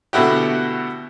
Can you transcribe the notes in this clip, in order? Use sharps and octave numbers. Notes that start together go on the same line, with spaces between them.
B2 D3 A3 E4 F#4 G4